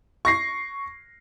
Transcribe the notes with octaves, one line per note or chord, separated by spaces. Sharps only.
C#6 A#6 C7